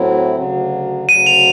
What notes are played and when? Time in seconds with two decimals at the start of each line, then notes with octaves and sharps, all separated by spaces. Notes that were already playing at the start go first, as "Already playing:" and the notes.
Already playing: A2 F#3 A3 C4 E4
0.35 D2 C#3 F#3
1.08 D2 C#3 F#3 D#7
1.26 F7